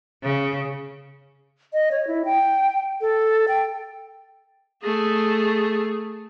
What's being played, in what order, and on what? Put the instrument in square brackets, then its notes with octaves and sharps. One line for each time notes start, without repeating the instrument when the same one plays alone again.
[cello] C#3
[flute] D#5
C#5
E4
G5
A4
G5
[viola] A3 G#4